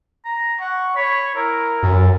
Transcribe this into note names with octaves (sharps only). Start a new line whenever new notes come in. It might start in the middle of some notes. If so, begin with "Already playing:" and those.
A#5
F#5 C#6
C#5 B5
E4 A#4
F#2 A4